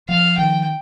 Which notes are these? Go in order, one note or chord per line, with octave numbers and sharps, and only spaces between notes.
F3 F5
D#3 G5